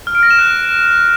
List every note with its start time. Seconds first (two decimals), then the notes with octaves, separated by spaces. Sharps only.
0.07 F6
0.15 D7
0.23 A#6
0.31 E7
0.38 F#6